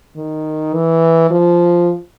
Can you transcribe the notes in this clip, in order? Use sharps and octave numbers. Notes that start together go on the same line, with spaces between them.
D#3
E3
F3